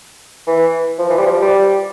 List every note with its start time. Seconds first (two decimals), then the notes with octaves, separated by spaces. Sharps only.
0.47 E3
0.99 F3
1.10 E3
1.18 G3
1.26 F3
1.42 G3